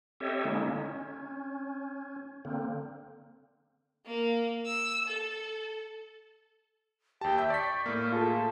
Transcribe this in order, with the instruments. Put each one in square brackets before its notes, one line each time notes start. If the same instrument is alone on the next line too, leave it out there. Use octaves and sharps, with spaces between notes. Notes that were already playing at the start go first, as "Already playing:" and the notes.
[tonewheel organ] C4 G4 A4 C#5 D#5 E5
D3 G#3 A#3 C#4 D#4 E4
C#4
D3 A#3 C4
[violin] A#3
E6
A4
[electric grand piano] D#2 A5 [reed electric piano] G4 [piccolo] G5
[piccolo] E5 [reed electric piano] E6 [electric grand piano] G6
[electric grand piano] D5 B6 [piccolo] C#6
[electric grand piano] A2 A#3 [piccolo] F6
[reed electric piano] F4 G#4 A4 [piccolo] A5